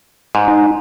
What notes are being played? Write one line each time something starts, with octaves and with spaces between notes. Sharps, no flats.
G#2
D#4